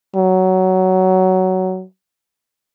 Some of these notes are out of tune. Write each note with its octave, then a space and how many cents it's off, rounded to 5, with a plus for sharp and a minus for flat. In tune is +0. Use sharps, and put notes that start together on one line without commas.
F#3 +15